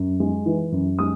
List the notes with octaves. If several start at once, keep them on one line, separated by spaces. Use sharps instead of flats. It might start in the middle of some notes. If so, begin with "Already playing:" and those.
Already playing: F#2
G#3
E3
F#2
G#3 D#6